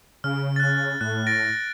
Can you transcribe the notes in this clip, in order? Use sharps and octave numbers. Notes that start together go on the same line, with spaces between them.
C#3 F6
F#6 A6
A2 F#6
A6 A#6 D7